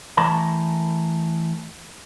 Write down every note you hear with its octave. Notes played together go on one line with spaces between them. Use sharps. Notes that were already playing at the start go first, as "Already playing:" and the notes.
E3 A3 A#4 A5 A#5